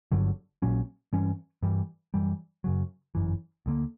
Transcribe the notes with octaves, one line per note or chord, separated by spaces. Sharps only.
G1 G2 D3 F#3
A#1 A#2 F#3 C#4
G2 E3 G3 C#4
G2 E3 G3
F#2 E3 G3
F#2 C#3 F#3
G1 F#2 E3
D2 D3 A#3